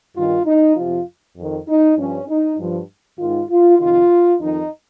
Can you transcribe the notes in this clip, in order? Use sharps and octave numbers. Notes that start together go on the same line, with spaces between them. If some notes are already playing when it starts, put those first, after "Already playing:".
G2 D#3 F4
D#4
F2 C3 F3 F4
F2 D#3
D#4
G2 F3 C#4
D#4
G2 F3
G#2 D#3 F4
F4
F2 C3 D#3 F4
F2 D#3 D#4